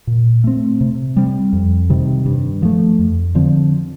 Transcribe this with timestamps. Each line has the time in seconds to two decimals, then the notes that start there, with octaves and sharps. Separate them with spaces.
0.07 A#2
0.44 A3 C4
0.81 C3
1.17 G3 C4
1.53 F2
1.90 C3 D#3 G3
2.26 G2
2.63 F3 A3
2.99 F2
3.35 D3 F3 C4